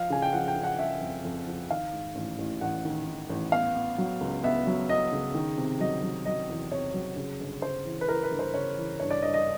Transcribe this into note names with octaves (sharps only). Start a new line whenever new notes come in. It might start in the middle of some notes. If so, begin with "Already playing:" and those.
Already playing: F3 F5
C#3 G#5
G5
F3 F#5
G5
C#3
F#5
C#3 E5
F2
F2
F3
D#3 F5
G#2
A1
A1
A1 F#5
D#3
D#3
A1
B3 F5
B3
F#3
C#2
B3 E5
F#3
B3 D#5
C#3
D#3
C3
F#3 D#5
F#3
F#3 D#5
E2
C3 C#5
F#3
C#3
G1
C#3 C5
E3
B4
E3 A#4
B4
G1
C5
C#3 C#5
E3
G2 C#5
D5
G2 D#5
D#5